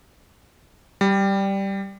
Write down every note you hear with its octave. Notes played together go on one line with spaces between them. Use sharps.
G3